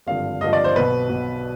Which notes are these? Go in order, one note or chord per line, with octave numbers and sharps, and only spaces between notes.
G#1 G2 D3 F3 F5
G#1 G2 D3 F3 D#5
D5
C5
B1 B2 B4
B1 B2